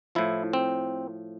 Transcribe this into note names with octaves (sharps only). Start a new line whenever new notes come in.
A2 F3 E4
C4